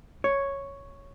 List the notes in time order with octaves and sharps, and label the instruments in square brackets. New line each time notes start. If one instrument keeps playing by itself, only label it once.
[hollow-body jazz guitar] C#5